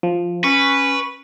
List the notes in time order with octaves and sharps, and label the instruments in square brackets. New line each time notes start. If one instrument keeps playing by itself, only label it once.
[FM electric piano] F3
[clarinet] C#4 [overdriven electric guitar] B4 [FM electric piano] C#6